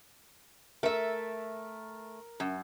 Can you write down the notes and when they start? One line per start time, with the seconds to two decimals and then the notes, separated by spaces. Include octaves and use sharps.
0.83 A3 A#4 E5
2.40 F#2